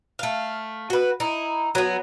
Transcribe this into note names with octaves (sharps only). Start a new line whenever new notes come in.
A3 F5
F#4 B4
D#4 E4
F#3 B3